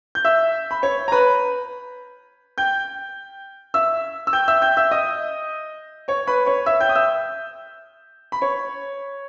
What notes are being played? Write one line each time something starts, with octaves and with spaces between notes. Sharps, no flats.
G6
E5 E6
B5
C#5 C#6
A#5
B4 B5
G5 G6
E5 E6
E6
G5 G6
E5 E6
G5 G6
E5 E6
D#5 D#6
C#5 C#6
B4 B5
C#5 C#6
E5 E6
G5 G6
D#6
E5 E6
B5
C#5 C#6